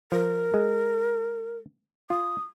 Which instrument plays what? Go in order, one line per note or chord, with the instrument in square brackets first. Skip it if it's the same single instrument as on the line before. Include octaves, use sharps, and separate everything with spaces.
[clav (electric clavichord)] F3 [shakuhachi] A#4
[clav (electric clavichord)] G#3
[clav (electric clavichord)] F4 [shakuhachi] D#6